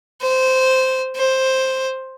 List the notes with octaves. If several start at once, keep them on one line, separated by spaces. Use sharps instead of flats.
C5
C5